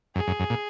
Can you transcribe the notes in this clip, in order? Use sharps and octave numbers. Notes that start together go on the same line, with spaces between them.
F#2 G#4
F#2
F#2
A#2